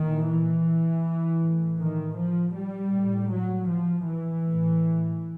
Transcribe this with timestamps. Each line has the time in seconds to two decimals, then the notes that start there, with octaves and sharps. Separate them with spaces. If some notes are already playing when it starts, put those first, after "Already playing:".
Already playing: A#2 D#3
0.27 E3
1.40 A2
1.79 D#3
2.17 F3
2.54 G3
2.92 A2
3.30 F#3
3.69 F3
4.06 E3
4.45 A2